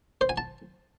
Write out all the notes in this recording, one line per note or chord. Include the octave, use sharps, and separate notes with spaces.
C5
G#5
A5